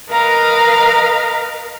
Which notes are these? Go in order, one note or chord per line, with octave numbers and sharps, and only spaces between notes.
A#4 B4 D#5 F5 A#5